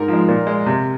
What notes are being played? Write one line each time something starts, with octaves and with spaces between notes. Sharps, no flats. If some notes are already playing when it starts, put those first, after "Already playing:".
Already playing: G#2 A#4
F3 G#3
A#2
G#3
C3